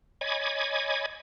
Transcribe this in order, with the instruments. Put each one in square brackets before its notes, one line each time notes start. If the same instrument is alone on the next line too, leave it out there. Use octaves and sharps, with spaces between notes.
[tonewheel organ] C#5 D#5 G#5 B5 D6 G#6